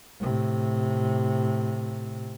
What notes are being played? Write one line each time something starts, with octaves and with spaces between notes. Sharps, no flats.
A2 C3